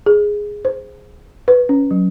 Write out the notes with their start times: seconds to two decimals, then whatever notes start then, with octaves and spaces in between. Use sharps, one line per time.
0.06 G#4
0.65 C5
1.48 B4
1.69 C#4
1.91 F#3